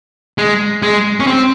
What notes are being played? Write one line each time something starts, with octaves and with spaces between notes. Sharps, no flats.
G#3
G#3
C#4
C4